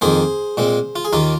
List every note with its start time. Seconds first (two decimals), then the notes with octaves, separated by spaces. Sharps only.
0.01 F2 D#3 A#3 G#4 C5
0.57 A#2 G#3 C4
0.96 F4
1.05 G#4
1.13 D#2 D#3 A#3 F4 A#4